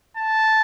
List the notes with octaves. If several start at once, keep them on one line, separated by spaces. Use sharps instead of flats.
A5